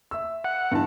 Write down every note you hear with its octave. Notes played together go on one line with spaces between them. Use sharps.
E5 E6
F#5
G2 E3 A5